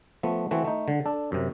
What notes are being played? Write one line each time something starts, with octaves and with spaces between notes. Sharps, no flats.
F3 A3 B3
E3 A3 C4 F#4
A3 D#4
D3
D4 A4
F#2 C3